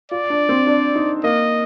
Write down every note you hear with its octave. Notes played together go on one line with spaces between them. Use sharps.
F4 D5
D4
C4
D4
D#4
A#3 D#5